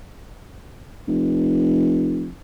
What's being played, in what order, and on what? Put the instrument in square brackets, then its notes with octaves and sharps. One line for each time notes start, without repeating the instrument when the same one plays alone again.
[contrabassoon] F1